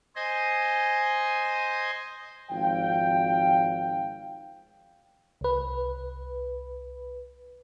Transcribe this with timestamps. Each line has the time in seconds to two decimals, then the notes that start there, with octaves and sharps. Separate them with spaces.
0.16 C5 D#5 G#5
2.51 G#1 F3 F5 G5
5.41 C2 B4